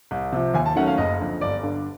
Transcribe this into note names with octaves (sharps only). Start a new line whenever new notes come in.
C2
C3 F3
D#2 G#5
A5
D#3 F#3 A3 C#4 F#5
F5
F#1 D#5
F2 D3
G1 D5
G2 D3